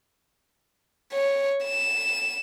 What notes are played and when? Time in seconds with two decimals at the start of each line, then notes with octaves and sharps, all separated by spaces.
1.13 C#5
1.65 E7